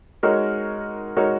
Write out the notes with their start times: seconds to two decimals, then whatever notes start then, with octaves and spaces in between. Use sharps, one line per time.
0.23 G#3 D#4 F#4 A#4 C#5
1.16 G#3 D#4 F#4 A#4 C#5